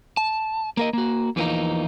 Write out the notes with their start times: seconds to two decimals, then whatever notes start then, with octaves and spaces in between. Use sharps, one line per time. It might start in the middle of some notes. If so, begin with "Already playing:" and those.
0.17 A5
0.77 A#3 A#4 D#5
0.93 A#3 F#4
1.36 E2 E3 F3 A#3 D#4